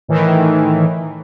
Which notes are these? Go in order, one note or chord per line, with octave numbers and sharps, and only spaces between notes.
A2 D#3 E3